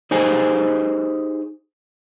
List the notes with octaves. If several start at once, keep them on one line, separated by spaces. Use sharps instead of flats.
D#4 G4 G#4 C5 D#5 G#5